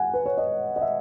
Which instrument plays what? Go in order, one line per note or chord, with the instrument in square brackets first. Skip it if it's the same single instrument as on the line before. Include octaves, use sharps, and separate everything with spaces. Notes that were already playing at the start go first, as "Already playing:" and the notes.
Already playing: [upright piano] F#5 G#5
B4
C#5
D#5
D#5
E5